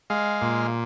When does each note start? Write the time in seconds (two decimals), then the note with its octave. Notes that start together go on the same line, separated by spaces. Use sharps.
0.10 G#3 F5
0.42 A#2